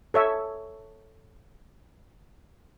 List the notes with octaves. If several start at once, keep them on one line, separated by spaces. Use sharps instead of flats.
A4 C#5 E5